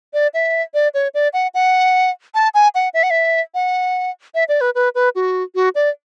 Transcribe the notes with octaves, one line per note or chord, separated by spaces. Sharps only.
D5
E5
D5
C#5
D5
F#5
F#5
A5
G#5
F#5
E5
F#5
E5
F#5
E5
D5
B4
B4
B4
F#4
F#4
D5